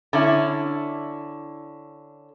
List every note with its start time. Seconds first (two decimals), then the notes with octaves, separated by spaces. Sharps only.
0.13 D3 C#4 E4